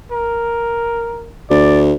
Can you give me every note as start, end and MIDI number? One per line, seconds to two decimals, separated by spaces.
0.11 1.30 70
1.50 1.93 38
1.50 1.79 74